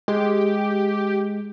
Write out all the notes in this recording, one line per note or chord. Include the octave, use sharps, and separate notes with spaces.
G#3 G4